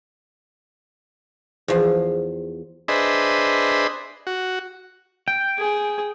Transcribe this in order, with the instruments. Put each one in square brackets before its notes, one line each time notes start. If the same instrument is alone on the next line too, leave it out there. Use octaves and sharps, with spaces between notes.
[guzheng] E2 F3
[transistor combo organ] D4 G#4 B4 C5 D#5 E5
F#4
[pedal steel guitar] G5
[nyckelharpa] G#4